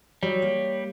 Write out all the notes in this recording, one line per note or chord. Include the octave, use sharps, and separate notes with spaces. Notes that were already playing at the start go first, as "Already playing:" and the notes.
F#3 G3 C#5
A#3